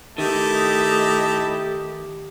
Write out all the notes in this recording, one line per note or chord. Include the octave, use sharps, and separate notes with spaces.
D#3 A3 D#4 E4 G4 D#5 A5